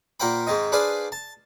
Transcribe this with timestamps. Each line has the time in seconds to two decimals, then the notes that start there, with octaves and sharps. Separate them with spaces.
0.20 A#2 A#4 C5 F#5 G5 B5
0.47 G#2 D#3 C4 D#5
0.72 D4 G#4 B4 C5 D5 F5
1.12 A5